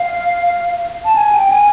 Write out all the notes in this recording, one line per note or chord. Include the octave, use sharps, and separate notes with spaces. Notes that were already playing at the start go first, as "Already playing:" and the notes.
Already playing: F5
A5
G#5
G5
G#5